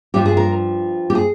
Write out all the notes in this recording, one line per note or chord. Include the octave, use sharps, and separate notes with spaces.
G2 F3 G4
G#4
A#4
G4
G#4